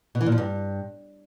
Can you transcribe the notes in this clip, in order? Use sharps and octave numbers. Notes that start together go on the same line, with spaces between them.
B2
E3
A#2
F3
G2